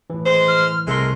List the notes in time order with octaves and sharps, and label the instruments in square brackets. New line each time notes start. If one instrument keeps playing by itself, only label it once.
[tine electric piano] A2 E3
[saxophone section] G#3 C5
[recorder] F6
[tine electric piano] C2 C6 [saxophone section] G#3 A3 [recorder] A#4